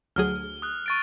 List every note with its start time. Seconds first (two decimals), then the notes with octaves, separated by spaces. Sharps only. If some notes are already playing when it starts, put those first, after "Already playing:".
0.16 D2 F#3 G#4 F6
0.62 D#6 F#6
0.86 C#6 A6 D7